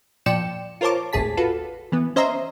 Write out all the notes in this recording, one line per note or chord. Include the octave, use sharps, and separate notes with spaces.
A#2 F3 D5 G5 C#7 E7
F4 A#4 C5 C#5 A5 D6
G#1 D#2 A2 G#4 A5 B6
F4 F#4 A4 B4
E3 B3
C#4 C5 D#5 E5 A#5 C6